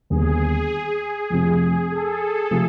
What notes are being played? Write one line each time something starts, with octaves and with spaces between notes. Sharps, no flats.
D#2 D3 G3 B3 G#4
F2 C3 F3 A3 C4
A4
C3 F3 A3